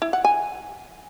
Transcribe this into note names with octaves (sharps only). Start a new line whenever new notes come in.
E4
F#5
G#5